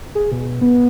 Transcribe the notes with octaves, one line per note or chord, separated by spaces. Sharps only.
G#4
B2
B3